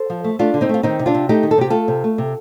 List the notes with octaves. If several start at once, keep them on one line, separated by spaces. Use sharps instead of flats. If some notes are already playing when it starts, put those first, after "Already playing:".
Already playing: A4 C5
F3
A3
A3 D4 F4
D3
C4 D#4
A3 F4
D#3 C4 D#4
C3
D4 F4
C3
A3 D#4 G4
D#3
A4
C3 G4
A3 F4 A4
C3
A3
C3